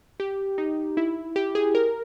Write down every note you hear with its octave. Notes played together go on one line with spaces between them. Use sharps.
G4
D#4
E4
G4
G#4
A#4